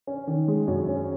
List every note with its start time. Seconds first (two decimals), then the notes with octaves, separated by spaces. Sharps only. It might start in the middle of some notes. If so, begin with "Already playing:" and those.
0.07 C#4
0.27 D#3
0.48 G#3
0.67 F#2
0.89 C#4